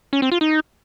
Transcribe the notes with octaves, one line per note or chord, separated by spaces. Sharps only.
C#4
C4
F4
D#4